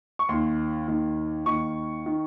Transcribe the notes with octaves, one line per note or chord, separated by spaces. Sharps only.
C#6
D#2 D#3 C6
D#2 D#3
D#2 D#3 C#6
D#3